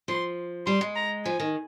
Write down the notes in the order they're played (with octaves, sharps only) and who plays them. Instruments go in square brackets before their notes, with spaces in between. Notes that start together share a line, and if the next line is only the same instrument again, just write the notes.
[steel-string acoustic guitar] F3 [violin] C6
[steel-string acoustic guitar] G3 [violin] C6
[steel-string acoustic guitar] G#3
[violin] A#5
[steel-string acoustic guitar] F3 [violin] G#5
[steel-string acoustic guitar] D#3